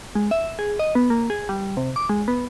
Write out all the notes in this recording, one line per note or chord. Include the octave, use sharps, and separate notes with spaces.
G#3
E5
G#4
D#5
B3
A#3
G#4
G3
C3
D6
G#3
B3